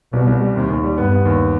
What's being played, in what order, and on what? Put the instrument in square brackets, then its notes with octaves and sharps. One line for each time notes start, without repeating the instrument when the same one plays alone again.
[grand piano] C2 [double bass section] B2
[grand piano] C2
G3
[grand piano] D#2 [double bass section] C3
[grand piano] D#2
G3
[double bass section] G2 [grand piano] B3
[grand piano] B3
D#2